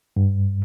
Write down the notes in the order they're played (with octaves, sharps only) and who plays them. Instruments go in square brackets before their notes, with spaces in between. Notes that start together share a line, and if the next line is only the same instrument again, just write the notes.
[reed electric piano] G2